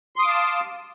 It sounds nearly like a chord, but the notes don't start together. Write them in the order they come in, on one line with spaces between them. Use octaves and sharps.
C6 D#6 D6 F5 A5